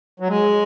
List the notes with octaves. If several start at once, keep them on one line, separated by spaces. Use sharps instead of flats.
F#3
G#3